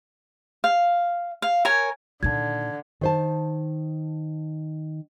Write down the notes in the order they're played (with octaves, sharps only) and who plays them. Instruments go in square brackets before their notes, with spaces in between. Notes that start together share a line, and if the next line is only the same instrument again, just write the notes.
[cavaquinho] F5
F5
A#4 C#5 G#5
[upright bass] A#2 D#3 [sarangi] D3 [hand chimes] A5 G#6
[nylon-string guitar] D#3 C5 A5